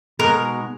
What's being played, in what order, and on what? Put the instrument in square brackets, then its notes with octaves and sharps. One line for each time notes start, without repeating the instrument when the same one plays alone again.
[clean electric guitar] B2 G#3 D#4 F#4 [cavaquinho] A#4